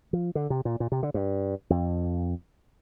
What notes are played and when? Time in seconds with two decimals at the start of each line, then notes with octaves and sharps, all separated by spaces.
0.13 F3
0.35 D3
0.50 C3
0.65 A#2
0.80 A#2
0.92 C3
1.03 D3
1.14 G2
1.70 F2